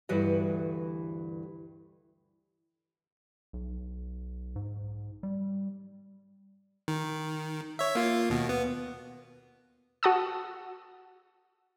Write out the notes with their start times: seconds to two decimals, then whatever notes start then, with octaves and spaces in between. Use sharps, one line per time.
0.09 D2 G2 E3 F#4 D#5
3.53 B1
4.56 G#2
5.23 G3
6.88 D#3
7.79 C#5 E5
7.95 A#3 F4
8.30 D#2 B2
8.49 B3
10.03 F#4 F#5 A5 D#6 E6